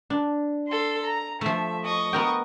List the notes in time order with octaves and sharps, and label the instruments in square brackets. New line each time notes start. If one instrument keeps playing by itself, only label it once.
[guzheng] D4
[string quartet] A4 C6
A#5
[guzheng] F3 A3 [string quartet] E5
[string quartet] D#5 C#6 D#6
[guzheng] B3 A#4 G5